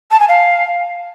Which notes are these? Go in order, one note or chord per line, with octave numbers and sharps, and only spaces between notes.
A5
G#5
F5